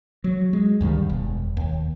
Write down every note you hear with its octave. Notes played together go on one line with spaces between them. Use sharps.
F#3
G#3
D2 G2 D#3 G3
E1
D#2